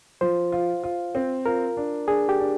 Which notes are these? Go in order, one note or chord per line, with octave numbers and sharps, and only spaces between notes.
F3 C5
F4
F4
C4
F4 A#4
D4
D4 G#4
G4
D4